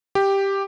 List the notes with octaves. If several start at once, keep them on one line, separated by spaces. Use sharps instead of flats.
G4